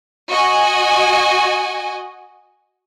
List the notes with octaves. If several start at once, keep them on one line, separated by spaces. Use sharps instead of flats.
F#4 D#5 G#5